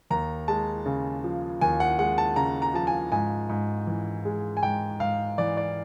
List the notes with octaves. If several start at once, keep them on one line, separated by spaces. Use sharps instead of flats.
D#2 A#5
G#3 A5
C#3
F3
D#2 G#5
F#5
G#3 F#5
A5
C#3 A#5
A#5
F3 A5
G#5
G#2 G#5
G#2
E3
G#3
G#5
G#2 G5
G#2 F5
E3 D5
D5